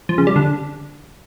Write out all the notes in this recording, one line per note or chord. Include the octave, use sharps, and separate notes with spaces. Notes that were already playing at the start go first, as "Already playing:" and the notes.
F3
C#3
G3
D3